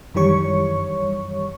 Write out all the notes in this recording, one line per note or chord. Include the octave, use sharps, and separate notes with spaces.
F#2 D#3 E3 G3 C#5 C#6